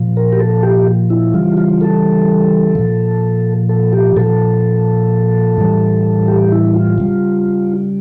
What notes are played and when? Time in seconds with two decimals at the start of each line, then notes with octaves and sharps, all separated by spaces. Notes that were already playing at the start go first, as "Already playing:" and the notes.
Already playing: A#2 F3
0.17 A#4
0.33 G4
0.40 A4
0.63 G4
1.10 E4
1.34 C#3 E3 G3 F4
1.57 F4
1.81 A4
2.75 A#2 F3
3.69 A4
3.93 G4
4.17 A#2 F3 A4
5.57 A2 E3 G3
6.28 G4
6.52 E4
6.74 F4
6.98 C#3 G3